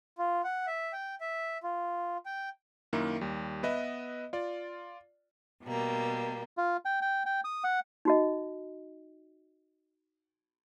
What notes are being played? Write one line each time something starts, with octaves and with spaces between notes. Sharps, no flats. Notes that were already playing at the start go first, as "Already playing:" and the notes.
F4
F#5
E5
G5
E5
F4
G5
F#2 D#3 A#3 E4
D#2 G3
B3 B4 D#5 E5
F4 D5
B2 G3 A#3
F4
G5
G5
G5
D#6
F#5
D#4 F#4 D#5